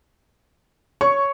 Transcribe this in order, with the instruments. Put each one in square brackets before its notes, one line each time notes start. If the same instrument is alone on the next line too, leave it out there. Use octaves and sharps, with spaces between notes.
[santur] C#5 [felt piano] C#6